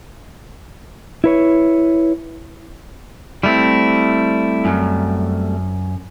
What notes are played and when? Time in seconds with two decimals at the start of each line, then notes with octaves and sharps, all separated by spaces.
1.24 E4 B4 C#5
3.43 G3 A3 C4 E4
4.65 F#2